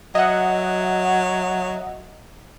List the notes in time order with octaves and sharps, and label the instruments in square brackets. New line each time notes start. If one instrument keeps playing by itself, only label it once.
[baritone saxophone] F#3 [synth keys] D#5 E5 F#5